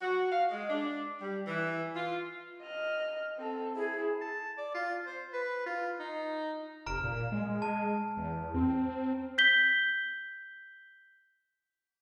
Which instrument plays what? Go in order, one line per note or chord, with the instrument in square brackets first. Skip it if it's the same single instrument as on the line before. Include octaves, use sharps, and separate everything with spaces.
[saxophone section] F#4
F5
G#3
D4
G3
E3
F4
[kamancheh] D#5 F6
C4 A4
[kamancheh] E4 [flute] G#4
[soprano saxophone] A5
D5
F4
C5
B4
F4
D#4
[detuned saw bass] F1 [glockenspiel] A#5 F6 D7
[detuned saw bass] A#2
G#3
[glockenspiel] A5
[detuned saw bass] E2
C4
[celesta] G6 B6 G7